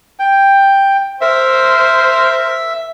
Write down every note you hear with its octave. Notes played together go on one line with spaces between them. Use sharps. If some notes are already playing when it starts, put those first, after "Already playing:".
G5
A#4 C5 E5